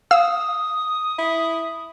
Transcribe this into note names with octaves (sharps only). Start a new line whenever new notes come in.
F5 D#6 E6
E4